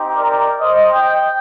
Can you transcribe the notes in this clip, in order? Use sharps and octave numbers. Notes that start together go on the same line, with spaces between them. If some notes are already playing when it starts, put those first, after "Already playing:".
Already playing: C4 D#4 G4
A#4 D5
C5 D#5
D#5 G5